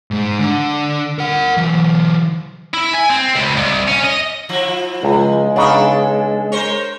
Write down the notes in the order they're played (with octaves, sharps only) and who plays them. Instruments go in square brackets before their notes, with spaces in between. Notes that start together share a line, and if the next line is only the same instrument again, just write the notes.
[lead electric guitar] G#2 G#3
D3
A#4 F#5
E3 F#3
[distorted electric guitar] E4
G#5
C4
C#2
C2
C#4
D#5
[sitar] F3 E4
[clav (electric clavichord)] C#2 [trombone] G#3
[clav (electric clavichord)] C#3 B3 D#4 [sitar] D4 A4
[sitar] A#4 C5 C#5